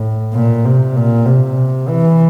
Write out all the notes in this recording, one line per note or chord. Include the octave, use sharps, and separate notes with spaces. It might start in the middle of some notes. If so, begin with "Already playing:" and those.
Already playing: A2
A#2
C3
A#2
C3
E3